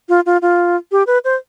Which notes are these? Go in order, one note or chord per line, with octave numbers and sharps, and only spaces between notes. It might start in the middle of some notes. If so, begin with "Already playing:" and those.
F4
F4
F4
G4
B4
C5